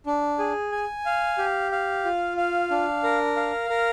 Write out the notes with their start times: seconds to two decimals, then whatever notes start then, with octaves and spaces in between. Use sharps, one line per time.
0.06 D4
0.39 G#4
0.72 G#5
1.06 F5
1.38 G4
1.72 F5
2.05 F4
2.37 F5
2.71 D4
3.03 A#4
3.36 F5
3.70 A#4